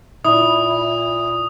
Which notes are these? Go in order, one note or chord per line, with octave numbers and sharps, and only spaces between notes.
A#2 E4 D#6